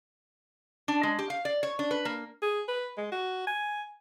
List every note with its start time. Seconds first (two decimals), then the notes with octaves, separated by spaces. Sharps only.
0.88 D4
1.03 G#3
1.19 G4
1.30 F5
1.45 D5
1.63 C#5
1.79 D4
1.91 B4
2.05 A#3
2.42 G#4
2.68 B4
2.97 G#3
3.12 F#4
3.47 G#5